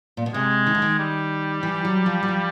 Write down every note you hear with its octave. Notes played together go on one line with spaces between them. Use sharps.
A#2
B2
C3 G#3
D#3
D3
D#3
G3
E3
F#3
F3
F#3
F3